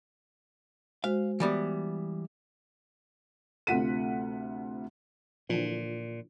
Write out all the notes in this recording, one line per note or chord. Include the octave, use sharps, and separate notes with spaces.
G#3 F#4 C5 F5
E3 G3 B3
D2 C3 F4 F#5 B6 D#7
A#2 D3 E3 F3